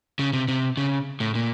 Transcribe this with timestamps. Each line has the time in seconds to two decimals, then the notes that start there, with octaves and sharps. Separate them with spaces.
0.19 C#3
0.33 C3
0.48 C3
0.77 C#3
1.20 A2
1.35 A#2